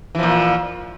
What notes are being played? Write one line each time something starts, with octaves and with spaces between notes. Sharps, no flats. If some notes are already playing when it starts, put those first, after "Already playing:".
A#2 E3 F3